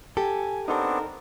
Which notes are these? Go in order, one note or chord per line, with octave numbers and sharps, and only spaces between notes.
G4 A4 G#5
B3 C4 D4 D#4 A4 A#4